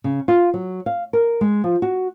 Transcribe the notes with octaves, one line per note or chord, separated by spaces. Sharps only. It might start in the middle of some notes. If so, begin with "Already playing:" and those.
C#3
F4
F#3
F5
A#4
G#3
F3
F#4